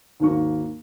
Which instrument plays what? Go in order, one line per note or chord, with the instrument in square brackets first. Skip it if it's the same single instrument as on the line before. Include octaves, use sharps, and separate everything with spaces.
[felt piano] D#2 G#2 D#3 A#3 F#4 C#6